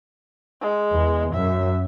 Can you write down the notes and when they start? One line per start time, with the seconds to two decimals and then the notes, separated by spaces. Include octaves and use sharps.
0.61 G#3
0.92 E2
1.35 F#2 E5